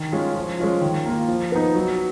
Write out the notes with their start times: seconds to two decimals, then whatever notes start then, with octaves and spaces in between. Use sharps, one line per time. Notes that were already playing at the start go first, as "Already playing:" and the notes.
Already playing: D#3
0.12 G#3 C#4 F4
0.35 F3
0.59 G#3 C#4 F4
0.81 D#3
1.05 A#3 F4
1.28 F3
1.52 B3 D#4
1.75 F#3